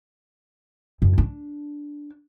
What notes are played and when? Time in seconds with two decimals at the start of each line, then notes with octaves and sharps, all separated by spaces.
1.02 F#2
1.18 D4